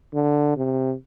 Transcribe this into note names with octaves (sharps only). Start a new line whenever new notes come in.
D3
C3